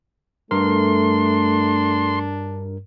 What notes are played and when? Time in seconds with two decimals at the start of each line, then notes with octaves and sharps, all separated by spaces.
0.51 G2 A3 D4 A#4 C6